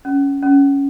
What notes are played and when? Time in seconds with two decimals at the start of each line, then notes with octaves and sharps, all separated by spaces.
0.05 C#4
0.43 C#4